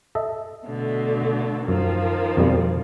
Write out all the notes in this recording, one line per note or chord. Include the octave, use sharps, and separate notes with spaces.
A4 D#5 E5
B2 D3 A3
F#2 D#3 F3
F2 B2 G3